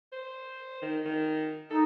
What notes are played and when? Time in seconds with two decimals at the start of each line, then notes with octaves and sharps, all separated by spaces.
0.12 C5
0.82 D#3
1.05 D#3
1.71 D#4 A4